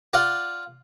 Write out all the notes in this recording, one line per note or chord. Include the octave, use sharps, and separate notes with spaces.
F4 D5 F#5